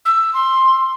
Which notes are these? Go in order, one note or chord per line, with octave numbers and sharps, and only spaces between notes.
E6
C6